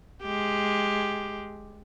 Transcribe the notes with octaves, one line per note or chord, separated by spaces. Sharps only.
G#3 G4